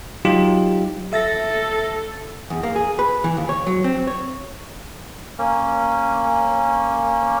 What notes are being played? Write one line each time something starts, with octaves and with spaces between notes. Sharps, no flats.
F#3 D#4 F4 G4
A4 E5 A6 A#6
E2
A#3
G#4
B4
E3
D#2
C#5
F#3
C4
C#5
A#3 C#4